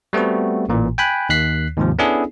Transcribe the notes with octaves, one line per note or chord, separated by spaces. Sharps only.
G3 A3 B3 C4 F#4
A1 A#2 E3
G5 G#5 B5 F#6
D#2 D#3 F#6 B6 C7
D#2 G#2 C3 F3
B3 C#4 D4 E4 G#4 A4